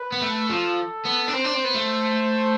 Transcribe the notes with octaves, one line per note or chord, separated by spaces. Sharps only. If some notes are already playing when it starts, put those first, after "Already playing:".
Already playing: B4
B3
A3
F3 A4
B3
D4
C4 C5
D4
C4
B3
A3